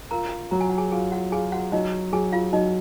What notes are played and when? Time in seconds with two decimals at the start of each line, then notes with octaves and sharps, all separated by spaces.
0.11 F4 A#4 A#5
0.51 F#3 A#5
0.61 G#5
0.70 F#5
0.78 G#4 G#5
0.91 F4 G#4 G#5
1.12 F#4 F#5
1.32 F4 G#4 G#5
1.52 F#4 F#5
1.72 F#3 D#4 D#5
2.13 F#3 G#4 G#5
2.32 F4 F5
2.53 F#3 D#4 D#5